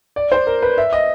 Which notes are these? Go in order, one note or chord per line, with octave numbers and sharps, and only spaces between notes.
D5
C5
A#4
B4
E5
D#5